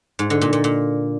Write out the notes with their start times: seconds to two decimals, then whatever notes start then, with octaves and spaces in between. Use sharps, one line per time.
0.19 G#2
0.30 D3
0.41 A#2
0.53 A#2
0.64 A#2